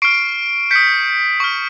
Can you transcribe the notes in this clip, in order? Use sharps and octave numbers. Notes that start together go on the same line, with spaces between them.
C#6 F6 C7 D7
D#6 G6 B6 C#7
C#6 F6